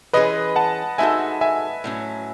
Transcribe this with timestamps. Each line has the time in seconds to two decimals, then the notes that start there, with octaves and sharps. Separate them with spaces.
0.13 E3 G#3 C#4 G#4 B4 D#5
0.56 F#5 A5
0.98 G#3 D#4 F#4 A4 E5 G#5
1.41 E5 G#5
1.84 A2 F#3 C#4